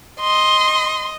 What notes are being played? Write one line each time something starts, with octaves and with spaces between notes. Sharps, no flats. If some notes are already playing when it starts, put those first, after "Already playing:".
D#5 C6